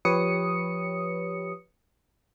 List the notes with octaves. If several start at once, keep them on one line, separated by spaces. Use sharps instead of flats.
F3 G4 B4 C#5 D#6 C#7